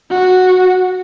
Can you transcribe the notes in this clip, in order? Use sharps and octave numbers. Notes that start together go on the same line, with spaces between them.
F#4